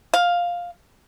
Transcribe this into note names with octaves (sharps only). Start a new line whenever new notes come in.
F5